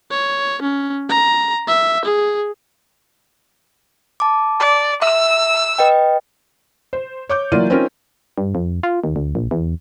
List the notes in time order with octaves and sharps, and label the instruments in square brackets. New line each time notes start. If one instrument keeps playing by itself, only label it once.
[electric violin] C#5
C#4
A#5
E5
G#4
[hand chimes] A5 D6
[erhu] D5
[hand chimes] E5 [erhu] E6
[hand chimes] B4 D#5 G5
[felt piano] C5
C#5 D6 G6
E3 F#3 A#3 F4 D5 D#7
C4 C#4 D#4 F4 A#4
[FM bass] G2
F2
F4
D#2
D2
A#1
E2